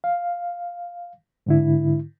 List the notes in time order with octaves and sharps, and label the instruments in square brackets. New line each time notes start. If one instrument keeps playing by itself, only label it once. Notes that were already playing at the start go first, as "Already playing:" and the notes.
[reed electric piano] F5
G#2 D3 E4